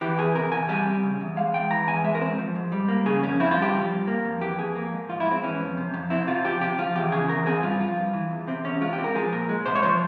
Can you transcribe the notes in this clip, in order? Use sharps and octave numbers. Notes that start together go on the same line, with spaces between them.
E3 G4
E2 G#4
C3 A#4
E2 G#5
G3 G#5
C4
C#3
E2
G#3 F5
E2 G5
E3 A#5
E2 G#5
G#3 E5
A#4
C4 C5
F3
G#2
G3
A#3
C#3 G#4
F2 C#4
C4 E4
F4
G2
G4
F3
G2
A#3
F2
E3 G4
F2 G#4
A#3
G#2
F3 F4
E4
G#2
C4
E3 C#4
F2
C3
F2
C4 E4
C3 F4
F3 G4
C3 G4
F3 F4
E2 G4
C#3 G#4
E2 A#4
C4 G#4
G2 F4
F3 F4
G2
E3
E2
C3 C4
E2 C#4
G#3 F4
G4
C4
A#4
F3 G#4
A#2 A#4
G#3
C3 C5
C#5
F3 C5